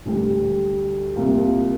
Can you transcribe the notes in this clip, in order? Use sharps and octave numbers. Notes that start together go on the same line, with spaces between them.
D2 D3 G3
C2 C3 A#3 F4